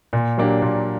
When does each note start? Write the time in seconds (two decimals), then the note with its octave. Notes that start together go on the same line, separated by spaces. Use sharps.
0.13 A#2
0.37 F#3 A#3 D4 G4
0.62 A#2